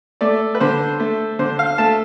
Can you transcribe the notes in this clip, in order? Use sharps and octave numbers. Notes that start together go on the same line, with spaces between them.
A3 D5
B4
D3 C5
A3
D3 C5
F5
A3 A5